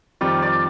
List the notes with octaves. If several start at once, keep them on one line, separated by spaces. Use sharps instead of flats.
F2 D#3 G3 C4 F4 D5
D5